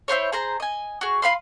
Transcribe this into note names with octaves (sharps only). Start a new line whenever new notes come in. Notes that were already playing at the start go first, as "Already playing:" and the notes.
E4 F4 C5 C#5
G#4 C5 A#5
D#5 G#5
F#4 G#4
F4 F5 B5 C6